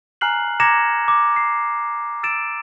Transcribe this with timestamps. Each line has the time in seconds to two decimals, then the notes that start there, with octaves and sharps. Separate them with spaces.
0.21 G#5 A#5 F6 F#6 C7 F#7
0.60 A#5 D6 G#6 A#6 C#7 E7
0.78 D6
1.08 D6
1.36 C7
2.23 E6 A6 D7 E7